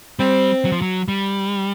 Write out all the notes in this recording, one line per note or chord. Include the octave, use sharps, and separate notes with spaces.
G3 C4
F#3
F3
F#3
G3